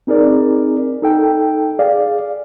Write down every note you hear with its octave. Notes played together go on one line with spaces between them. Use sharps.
C4 D#4 G#4 A#4 D5
D#4 A4 G5
G#4 D5 F5